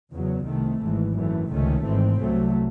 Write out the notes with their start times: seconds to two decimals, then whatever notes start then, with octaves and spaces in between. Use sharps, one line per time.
0.12 E2 C#3 F#3
0.46 C2 C3 D#3 A3
0.81 G#1 G#2 E3
1.15 F#2 E3 A3
1.49 C#2 C3 D#3 A3 C#4
1.84 G#1 G#2 E3 C4
2.18 C2 C3 F#3 A3